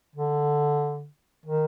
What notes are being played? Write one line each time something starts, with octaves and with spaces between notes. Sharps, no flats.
D3
D#3